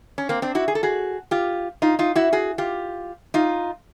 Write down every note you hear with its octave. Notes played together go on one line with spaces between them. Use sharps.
C#4
A#3 C4
C4 D4
E4 F#4
G#4
A4
F#4 G#4
F4 G4
D#4 F4
D#4 F4
E4 F#4
F#4 G#4
F4 G4
D#4 F4